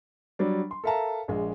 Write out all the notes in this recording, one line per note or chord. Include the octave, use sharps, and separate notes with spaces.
F#3 G3 D4
C6
A4 A#4 E5 F5 A5 A#5
A#1 G#3